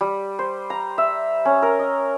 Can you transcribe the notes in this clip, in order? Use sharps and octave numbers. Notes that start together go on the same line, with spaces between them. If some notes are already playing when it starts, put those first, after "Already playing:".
G3
C5
A#5
E5
C#4
A#4
D#5